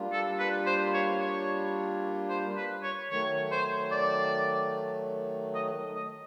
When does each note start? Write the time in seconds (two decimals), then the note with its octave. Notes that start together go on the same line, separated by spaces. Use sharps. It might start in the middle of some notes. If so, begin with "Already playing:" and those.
Already playing: G3 A#3 D4 F4
0.13 A4
0.39 B4
0.66 C5
0.94 C#5
1.21 C#5
2.30 C5
2.57 B4
2.83 C#5
3.10 D#3 F#3 A3 C#5
3.52 C5
3.92 D5
5.55 D#5
5.96 D#5